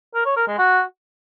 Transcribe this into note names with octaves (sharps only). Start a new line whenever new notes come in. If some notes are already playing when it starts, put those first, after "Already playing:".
A#4
C#5
A#4
G#3
F#4